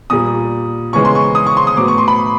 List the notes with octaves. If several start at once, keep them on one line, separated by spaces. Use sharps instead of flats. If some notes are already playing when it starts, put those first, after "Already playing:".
A#2 G3 A#3 D#6
C#3 E3 G#3 B3 C#6
C6
C#6
D#6
C#6
C6
D#6
A2 F#3 B3 D6
C#6
C6
B5